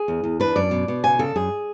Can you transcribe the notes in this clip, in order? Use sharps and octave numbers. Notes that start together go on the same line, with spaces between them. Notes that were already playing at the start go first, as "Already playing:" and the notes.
Already playing: G#4
E2
E2
D4 B4
F#2 D5
B2
B2
C#3 G#5
C#3 A4
F#2 G#4